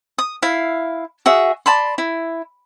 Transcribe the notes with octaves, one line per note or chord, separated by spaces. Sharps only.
D#6
E4 F5
F#4 G#4 E5
D5 A5 B5 C6
E4